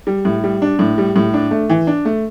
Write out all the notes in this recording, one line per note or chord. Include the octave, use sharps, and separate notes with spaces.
G3
A2
G3
D4
A2
G3
A2
D4
A3
E3
D4
A3